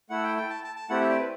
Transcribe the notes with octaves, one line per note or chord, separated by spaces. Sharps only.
A3 E4 A4 F#5
G5
G5
A5
A5
A5
A3 C4 E4 G4 F#5
E5
D5
B4